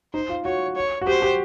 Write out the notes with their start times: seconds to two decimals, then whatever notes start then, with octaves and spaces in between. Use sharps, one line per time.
0.13 D#4 C5
0.29 F4
0.45 F#4 C#5
0.76 C#5
1.01 F#4
1.07 G4 C5
1.22 G4